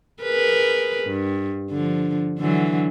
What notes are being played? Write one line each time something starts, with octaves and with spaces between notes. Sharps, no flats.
G#4 A#4 B4
G2
D3 F3
D3 E3 F#3